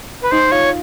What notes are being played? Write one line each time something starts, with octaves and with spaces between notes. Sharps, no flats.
B4
D#4 C5
F4 C#5